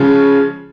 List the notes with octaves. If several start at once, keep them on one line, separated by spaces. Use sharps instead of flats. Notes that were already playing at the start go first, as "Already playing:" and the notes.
Already playing: C#3 F3 G#3 C#4 F4